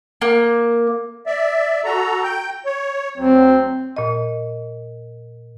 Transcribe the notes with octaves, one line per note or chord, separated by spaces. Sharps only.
A#3
D5 E5
F#4 A4 A#5
G5 G6
C#5
D2 F#3 C4
A#2 D#5